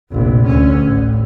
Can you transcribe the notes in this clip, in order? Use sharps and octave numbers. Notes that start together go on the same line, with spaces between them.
F1 A#1
D2 C#4
A1